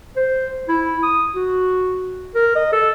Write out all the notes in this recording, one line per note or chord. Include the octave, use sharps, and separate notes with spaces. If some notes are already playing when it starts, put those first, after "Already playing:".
C5
E4
D#6
F#4
A#4
D#5
A4